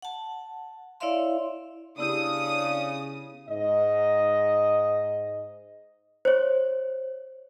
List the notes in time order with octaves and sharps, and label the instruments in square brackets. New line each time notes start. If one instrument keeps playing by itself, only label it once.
[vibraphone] F#5 A5
E4 C#5 D5 E5 F5 C6
[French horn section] C#3 [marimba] B3 E4 G4 [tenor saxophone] D4 [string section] D#6
[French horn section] G#2 D#5
[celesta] C5 C#5